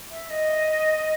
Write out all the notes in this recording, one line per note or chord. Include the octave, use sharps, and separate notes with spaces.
E5
D#5